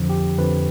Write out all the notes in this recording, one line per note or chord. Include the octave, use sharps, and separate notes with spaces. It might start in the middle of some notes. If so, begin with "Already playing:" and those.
Already playing: F2 D3 F3
G4
F2 D3 F3 B4